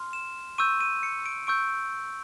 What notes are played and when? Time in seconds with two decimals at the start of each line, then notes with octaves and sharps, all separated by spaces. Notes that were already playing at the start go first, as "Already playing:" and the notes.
Already playing: C6 F6
0.13 E7
0.58 C#6 E6 G6 D#7
0.81 D#7
1.03 C#7
1.26 D7
1.47 C#6 E6 G6 D7